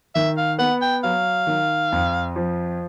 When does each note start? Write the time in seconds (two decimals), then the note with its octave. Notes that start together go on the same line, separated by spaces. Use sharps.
0.15 D#3 E5
0.37 F5
0.59 B3 F#5
0.81 G5
1.04 F#3 F5
1.47 D#3
1.92 F2
2.36 F3